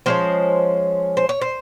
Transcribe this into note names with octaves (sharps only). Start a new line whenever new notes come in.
F3 G#3 C#4 C5
C5
C#5
C5